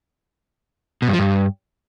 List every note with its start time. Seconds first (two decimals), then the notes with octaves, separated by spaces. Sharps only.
1.02 B2
1.08 G2
1.13 F3
1.19 G2